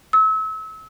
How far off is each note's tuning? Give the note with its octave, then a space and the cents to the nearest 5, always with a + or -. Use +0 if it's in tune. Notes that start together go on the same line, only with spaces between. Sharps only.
E6 -35